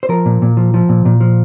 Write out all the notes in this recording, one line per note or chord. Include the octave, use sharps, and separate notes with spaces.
C5
F3 A#4
A#2
A#2
F3
F3
A#2
A#2
F3